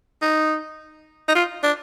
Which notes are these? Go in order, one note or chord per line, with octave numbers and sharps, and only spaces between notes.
D#4
D#4
F4
D4